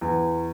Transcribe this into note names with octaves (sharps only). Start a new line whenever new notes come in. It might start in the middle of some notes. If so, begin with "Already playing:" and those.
E2